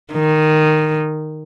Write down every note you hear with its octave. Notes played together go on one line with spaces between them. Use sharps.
D#3